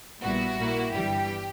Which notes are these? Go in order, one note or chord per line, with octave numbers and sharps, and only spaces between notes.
A#1 A#2 G3 B3 E4 F#4
A#2 A#3 E4
G1 G2 E3 G3 G4